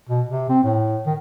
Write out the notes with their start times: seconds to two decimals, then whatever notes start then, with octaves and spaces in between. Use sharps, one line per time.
0.09 B2
0.29 C3
0.49 C4
0.64 A2
1.06 D#3